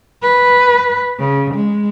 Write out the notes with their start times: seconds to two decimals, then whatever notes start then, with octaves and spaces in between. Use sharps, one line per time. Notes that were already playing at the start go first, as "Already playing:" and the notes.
0.23 B4
1.20 C#3
1.55 G#3